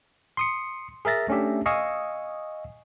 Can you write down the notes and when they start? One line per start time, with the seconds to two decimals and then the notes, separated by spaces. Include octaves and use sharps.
0.37 C6 D#6 C#7
1.05 G#4 A#4 E5 A6 A#6
1.28 A3 C#4 D4 G4 E5
1.66 D#5 F5 G#5 C#6 D#6 E6